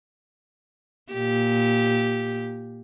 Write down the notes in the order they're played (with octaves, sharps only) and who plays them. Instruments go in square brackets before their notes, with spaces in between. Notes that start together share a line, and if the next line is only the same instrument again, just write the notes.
[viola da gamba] A#2 G4